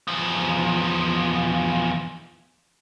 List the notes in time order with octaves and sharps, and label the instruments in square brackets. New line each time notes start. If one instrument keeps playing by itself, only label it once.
[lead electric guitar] E2 F3